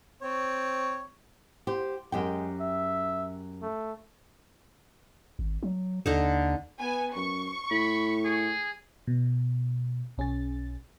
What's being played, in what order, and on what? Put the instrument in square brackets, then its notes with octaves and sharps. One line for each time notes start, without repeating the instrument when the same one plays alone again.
[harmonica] C4 C#5
[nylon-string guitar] G4 [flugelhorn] C5
[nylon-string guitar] F#2 G4 G5 [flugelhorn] G#3
[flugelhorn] E5
A3
[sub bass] G#1
F#3
[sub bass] D#2 [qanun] D3 D#4 A4
[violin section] B3 G#5
[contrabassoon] F#2 [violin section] C#6
[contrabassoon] A2 [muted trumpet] B5
[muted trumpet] G#4
[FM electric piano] B2
B1 C#4 G#4 A6